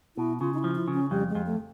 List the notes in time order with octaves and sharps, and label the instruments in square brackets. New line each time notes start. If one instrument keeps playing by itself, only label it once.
[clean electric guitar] B2 [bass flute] E4
[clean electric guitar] C#3 [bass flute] F4
[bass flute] D#4
E4
[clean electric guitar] F3
[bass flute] E4
[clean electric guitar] C#3
[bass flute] C#4
[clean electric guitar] F2 [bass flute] G3
[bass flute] G#3
[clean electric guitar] F2
[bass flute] A3